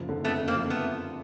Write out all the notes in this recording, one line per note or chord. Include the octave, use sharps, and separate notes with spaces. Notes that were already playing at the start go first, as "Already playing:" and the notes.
Already playing: F#1 F3
D3
F2 A3 B3
F#1
A#3 C4
F3
A3 B3